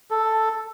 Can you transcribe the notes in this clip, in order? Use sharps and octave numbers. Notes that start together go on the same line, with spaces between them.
A4